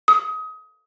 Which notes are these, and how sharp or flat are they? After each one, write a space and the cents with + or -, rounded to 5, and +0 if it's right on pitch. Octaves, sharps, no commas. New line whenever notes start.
D#6 +25